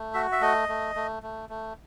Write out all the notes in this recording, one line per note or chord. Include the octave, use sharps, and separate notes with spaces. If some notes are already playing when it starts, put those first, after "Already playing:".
Already playing: A3
F#4 E5
E5
A3 D#5
A3
A3
A3
A3